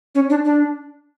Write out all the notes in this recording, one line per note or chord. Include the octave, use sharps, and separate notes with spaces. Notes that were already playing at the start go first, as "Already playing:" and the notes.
C#4
D4
D4